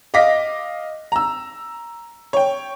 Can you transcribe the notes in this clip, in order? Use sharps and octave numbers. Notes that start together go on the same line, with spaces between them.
D#5 F5 D6 A#6 B6
A#5 E6
C#5 G5